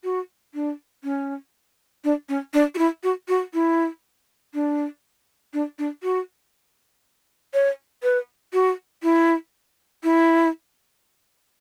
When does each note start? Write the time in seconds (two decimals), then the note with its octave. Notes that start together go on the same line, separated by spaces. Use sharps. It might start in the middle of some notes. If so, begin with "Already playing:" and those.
0.04 F#4
0.54 D4
1.04 C#4
2.04 D4
2.29 C#4
2.54 D4
2.75 F#4
2.78 E4
3.03 F#4
3.28 F#4
3.54 E4
4.54 D4
5.54 D4
5.79 D4
6.03 F#4
7.54 C#5
8.03 B4
8.53 F#4
9.03 E4
10.04 E4